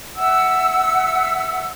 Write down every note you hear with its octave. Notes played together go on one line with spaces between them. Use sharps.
E5 F#5 E6